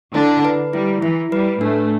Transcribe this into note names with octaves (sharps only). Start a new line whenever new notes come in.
D3 D4 E4
B4
G3 E4
E3 E4
G3 B4
A2 A3 D4